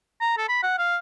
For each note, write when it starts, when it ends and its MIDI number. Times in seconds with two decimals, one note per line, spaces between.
0.21 0.36 82
0.38 0.46 69
0.49 0.61 83
0.63 0.76 78
0.78 0.97 77